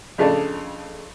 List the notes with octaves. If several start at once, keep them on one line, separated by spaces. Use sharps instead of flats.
F2 C#3 A3 D4